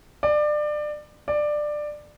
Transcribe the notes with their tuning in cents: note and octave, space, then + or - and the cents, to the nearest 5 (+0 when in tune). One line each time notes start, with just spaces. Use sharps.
D5 +25
D5 +15